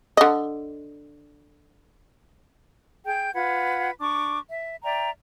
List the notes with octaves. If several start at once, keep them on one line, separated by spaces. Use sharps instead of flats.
D3 D#5
G#4 G5 G6
F4 B4 F#5 G#6
D4 C#6 D6
E5
D5 E5 G5 A#5